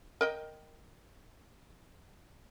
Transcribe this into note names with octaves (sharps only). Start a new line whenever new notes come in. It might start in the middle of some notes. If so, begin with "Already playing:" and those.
A#4 D#5 G5